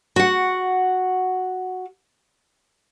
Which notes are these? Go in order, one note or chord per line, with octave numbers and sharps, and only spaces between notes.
F#4 F#5